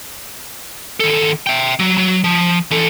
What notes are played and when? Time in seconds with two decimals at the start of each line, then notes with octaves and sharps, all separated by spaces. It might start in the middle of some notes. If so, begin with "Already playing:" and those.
1.00 D#3 A4
1.47 E5 G5
1.79 F#3
1.98 F#3
2.24 F3
2.71 E3 A4